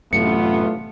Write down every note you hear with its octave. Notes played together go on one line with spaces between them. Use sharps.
A1 F#2 A2 C3 A3 B3 F4 C#7